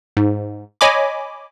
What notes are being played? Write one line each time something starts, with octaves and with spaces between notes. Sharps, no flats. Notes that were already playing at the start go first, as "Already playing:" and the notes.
G#2
C#5 D#5 G#5 B5 D6